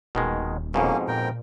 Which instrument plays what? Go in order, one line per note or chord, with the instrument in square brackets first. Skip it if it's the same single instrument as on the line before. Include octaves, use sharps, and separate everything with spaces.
[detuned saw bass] D#1 [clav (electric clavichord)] B2 D#3 G#3
[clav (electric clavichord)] F2 G#2 B2 [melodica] A#3 C#4
[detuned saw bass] A#2 [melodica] A#4 G5